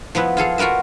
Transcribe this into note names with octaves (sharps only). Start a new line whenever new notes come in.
F3 B3 E4 B4
F4 G#4 A4 F5
F4 F#4 A#4 B4 E5